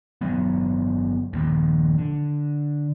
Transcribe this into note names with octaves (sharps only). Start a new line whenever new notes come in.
G1 E2 F#3 B3
D#1 A#1 D#2
D3